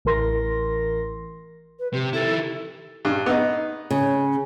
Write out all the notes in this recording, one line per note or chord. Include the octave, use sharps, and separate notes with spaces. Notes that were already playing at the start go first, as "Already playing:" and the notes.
A1 E3 A#4 C6 A#6
B4
C3 G4
D#3 E4 A4
G2
B3 D#4
C#3